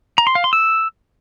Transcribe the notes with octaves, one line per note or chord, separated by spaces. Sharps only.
A#5
C6
F5
C6
E6